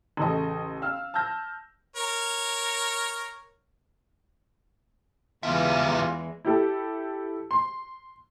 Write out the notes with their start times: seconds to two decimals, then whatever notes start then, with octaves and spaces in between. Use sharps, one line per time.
0.17 A1 C#3 A4 D#5
0.82 F5 E6 F6
1.14 A5 E6 F6 G6 A#6
1.96 A#4 C#5
5.43 E2 E3 G3 G#3 F4 E5
6.45 E4 G4 A4
7.51 C6